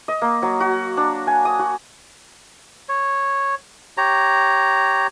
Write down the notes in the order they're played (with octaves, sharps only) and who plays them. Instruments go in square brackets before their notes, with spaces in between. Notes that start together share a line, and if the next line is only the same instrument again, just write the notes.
[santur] D#5
A#3
F#3
F#4
D4
G#5
D#6
F#4
[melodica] C#5
G4 C#5 A#5